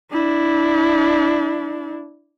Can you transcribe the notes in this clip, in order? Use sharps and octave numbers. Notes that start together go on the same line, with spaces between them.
D4 E4